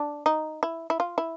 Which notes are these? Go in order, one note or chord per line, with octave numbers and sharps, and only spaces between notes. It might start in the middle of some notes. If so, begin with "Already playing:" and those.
Already playing: D4
D#4
E4
E4
F4
E4